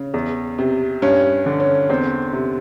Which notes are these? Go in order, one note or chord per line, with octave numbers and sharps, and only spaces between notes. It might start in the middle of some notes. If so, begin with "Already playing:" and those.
Already playing: C#3
E2
C3
G2 C#4
D3
C#4
E2 C4
C3